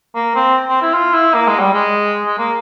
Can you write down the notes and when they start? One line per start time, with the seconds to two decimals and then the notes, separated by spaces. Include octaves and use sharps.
0.15 A#3
0.35 C4
0.68 C4
0.82 E4
0.94 F4
1.14 E4
1.34 A#3
1.47 G#3
1.59 G3
1.73 G#3
2.25 G#3
2.38 A#3